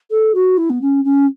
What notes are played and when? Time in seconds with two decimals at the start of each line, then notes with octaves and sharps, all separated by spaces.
0.10 A4
0.34 F#4
0.57 E4
0.69 B3
0.81 C#4
1.04 C#4